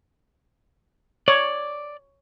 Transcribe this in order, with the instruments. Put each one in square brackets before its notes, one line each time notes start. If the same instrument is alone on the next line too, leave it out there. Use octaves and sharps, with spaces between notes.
[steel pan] C#5 [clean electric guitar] D5